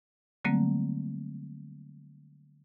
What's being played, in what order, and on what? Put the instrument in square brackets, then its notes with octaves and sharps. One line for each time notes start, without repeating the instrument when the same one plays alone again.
[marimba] D3 F#3 G3 A3 A#3 C4